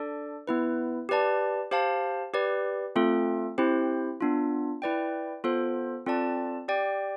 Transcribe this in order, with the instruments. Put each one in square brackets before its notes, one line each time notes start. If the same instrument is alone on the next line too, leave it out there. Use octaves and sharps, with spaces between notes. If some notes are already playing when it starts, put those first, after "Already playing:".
Already playing: [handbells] D4 A4 D5
B3 E4 B4
G4 B4 D5 A5
G4 C5 F5 A5
G4 B4 D5
A3 C4 F4 A4
C4 E4 G4 C5
B3 D4 F4
E4 B4 D5 G5
B3 F4 A4 C5
C4 F4 A4 D5 A5
G4 D5 G5